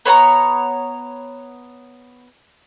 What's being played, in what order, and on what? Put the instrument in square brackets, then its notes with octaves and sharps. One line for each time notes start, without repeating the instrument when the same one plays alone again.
[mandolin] B3 C#5 F#5 A#5